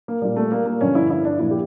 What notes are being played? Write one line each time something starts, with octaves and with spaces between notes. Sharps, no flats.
A#3
A#2 G3 A#3
A3
A#3
A#3
G2 D3 F3 C#4
E4
E4
D4
A#2 F3 E4
G4